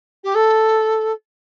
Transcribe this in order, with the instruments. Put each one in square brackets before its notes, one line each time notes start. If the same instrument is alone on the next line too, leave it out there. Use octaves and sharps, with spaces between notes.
[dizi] G4
A4